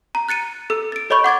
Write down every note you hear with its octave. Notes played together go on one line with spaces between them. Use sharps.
A#5
F#6 A6 C#7 D#7
A4 E6
A6 D7
A4 C#5 D#5 B5 C#6 G6
F#5 D6 G#6 A6